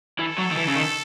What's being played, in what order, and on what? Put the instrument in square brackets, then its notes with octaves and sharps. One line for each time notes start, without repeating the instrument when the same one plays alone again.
[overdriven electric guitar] E3 [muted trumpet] A4
[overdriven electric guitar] F#3
D#3
E3
C#3
D#3